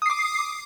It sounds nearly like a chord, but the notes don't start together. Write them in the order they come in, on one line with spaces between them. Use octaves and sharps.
D#6 C7 D6